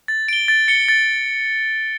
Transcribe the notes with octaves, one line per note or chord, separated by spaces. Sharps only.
A6
D7 G7
A6
C#7 G7
A6